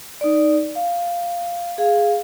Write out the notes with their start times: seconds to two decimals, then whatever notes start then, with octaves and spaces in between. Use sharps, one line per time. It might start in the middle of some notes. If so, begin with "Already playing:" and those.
0.21 D#4 D5
0.75 F5
1.78 G#4 F5